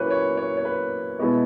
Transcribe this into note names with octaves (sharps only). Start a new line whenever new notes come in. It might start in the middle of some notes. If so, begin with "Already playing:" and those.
Already playing: A#2 F#3 A#3 C#4 E4 B4 C#5
C#5
C#5
C#5
B4
B2 G#3 B3 E4